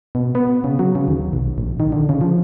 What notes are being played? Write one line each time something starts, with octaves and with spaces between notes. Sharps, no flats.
B2
B3
C#3
F#3
C#3
D#2
B1
A#1
D#3
D3
C#3
F3